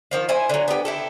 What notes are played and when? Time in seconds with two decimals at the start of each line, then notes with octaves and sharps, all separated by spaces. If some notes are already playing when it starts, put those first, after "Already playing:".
0.11 D#3 F3 F4
0.29 E4 C5 G#5
0.49 D3 F#3
0.68 B3 G4
0.85 E4 G4 A4